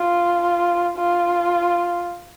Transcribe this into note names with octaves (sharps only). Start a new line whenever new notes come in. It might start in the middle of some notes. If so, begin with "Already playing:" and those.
Already playing: F4
F4